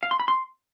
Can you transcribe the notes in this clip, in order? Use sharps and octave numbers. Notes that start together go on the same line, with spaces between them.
F5
C6
B5
C6